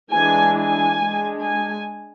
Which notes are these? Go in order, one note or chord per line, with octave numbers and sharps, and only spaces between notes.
E3 G#3 D4 G#5
G#5
G#3 D4
G#5